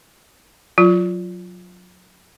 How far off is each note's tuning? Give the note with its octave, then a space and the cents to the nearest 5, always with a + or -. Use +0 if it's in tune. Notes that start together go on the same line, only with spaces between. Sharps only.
F#3 -25 F4 +0